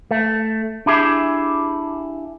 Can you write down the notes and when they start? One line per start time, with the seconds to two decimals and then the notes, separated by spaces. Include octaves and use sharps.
0.11 A3
0.86 D4 E4 G4 G#4 E5